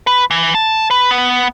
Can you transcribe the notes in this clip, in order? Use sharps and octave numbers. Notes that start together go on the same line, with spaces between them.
B4
E3
A5
B4
B3